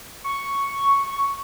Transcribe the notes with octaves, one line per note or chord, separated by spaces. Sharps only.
C#6